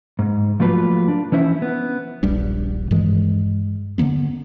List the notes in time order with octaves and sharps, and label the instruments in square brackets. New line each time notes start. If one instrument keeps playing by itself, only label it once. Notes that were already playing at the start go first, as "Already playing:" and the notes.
[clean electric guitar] G#2
F3 F#3 A3 A#3 F4 B4
D4
E3 C#4 E4 C5 E5
B3
[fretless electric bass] D#1 A#1 G3 D4
G2 D#3 E3 G#3
D3 F#3 A#3 B3